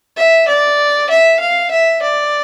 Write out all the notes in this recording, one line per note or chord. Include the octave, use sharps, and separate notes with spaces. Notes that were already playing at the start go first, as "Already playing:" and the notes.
E5
D5
E5
F5
E5
D5